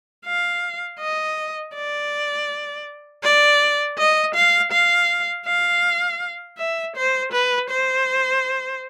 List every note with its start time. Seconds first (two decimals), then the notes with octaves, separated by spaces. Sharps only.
0.26 F5
1.00 D#5
1.75 D5
3.23 D5
3.98 D#5
4.35 F5
4.72 F5
5.46 F5
6.58 E5
6.96 C5
7.33 B4
7.70 C5